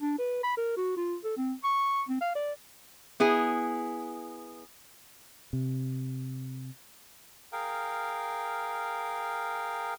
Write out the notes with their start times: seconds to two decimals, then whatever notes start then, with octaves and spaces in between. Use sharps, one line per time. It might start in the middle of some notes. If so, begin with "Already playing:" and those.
0.01 D4
0.18 B4
0.43 B5
0.57 A#4
0.77 F#4
0.97 F4
1.24 A4
1.37 C4
1.64 C#6
2.09 C4
2.21 F5
2.35 D5
3.20 B3 E4 G#4
5.53 C3
7.53 G#4 A#4 F5 G5